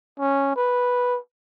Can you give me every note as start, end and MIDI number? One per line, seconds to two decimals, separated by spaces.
0.19 0.56 61
0.56 1.18 71